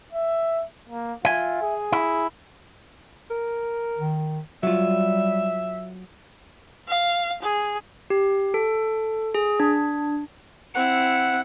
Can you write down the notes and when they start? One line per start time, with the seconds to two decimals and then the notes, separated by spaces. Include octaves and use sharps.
0.13 E5
0.89 A#3
1.25 F4 E5 G#5
1.62 G#4
1.92 E4
3.31 A#4
3.98 D#3
4.63 F#3 G3 F4 E5
6.88 F5
7.42 G#4
8.10 G4
8.54 A4
9.35 G#4
9.60 D4
10.75 C4 E4 F#5